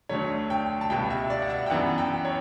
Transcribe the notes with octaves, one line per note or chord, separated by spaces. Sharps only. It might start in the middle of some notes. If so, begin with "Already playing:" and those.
D2 D3 F#3 A3 C#5
G5
A5
C#2 B2 G3 B3 G5
E5
D5
F#5
E5
G5
F#2 E3 B3 F#5
G5
C#5